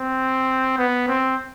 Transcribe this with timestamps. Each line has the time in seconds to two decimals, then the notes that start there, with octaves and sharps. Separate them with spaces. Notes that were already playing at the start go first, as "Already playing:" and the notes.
Already playing: C4
0.78 B3
1.08 C4